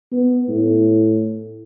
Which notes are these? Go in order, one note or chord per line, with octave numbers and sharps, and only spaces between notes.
B3
A2